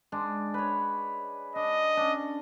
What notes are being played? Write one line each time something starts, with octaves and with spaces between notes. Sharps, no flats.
G#3 D4
B4 C#5
D4 D#5
C#4 D4